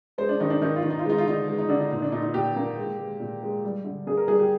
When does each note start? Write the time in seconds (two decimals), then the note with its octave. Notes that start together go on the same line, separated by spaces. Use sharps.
0.18 G#3 C5
0.29 D4
0.40 D#3 D#4
0.50 D4
0.62 D#3 D#4
0.76 F4
0.83 D#3
0.90 D#4
0.99 F4
1.05 G#3 D#4
1.18 F4
1.26 D3 D#4
1.48 G#3
1.58 D#4
1.69 D3 D4
1.80 D#4
1.91 A#2 D#4
2.02 D4
2.12 A#2 D#4
2.23 D#4
2.34 A#2 G4
2.56 A#3
2.78 G#3
2.98 G#3
3.20 A#2
3.43 G#3
3.64 G3
3.84 D3
4.07 A#3 G#4
4.17 A#4
4.28 G3 G#4
4.39 G4